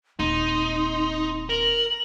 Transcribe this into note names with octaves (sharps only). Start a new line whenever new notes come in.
D#1 C4 D#4 C6
A#4 F#7